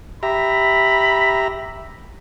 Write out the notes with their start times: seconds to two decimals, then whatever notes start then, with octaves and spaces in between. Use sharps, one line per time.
0.23 G4 E5 A#5 B5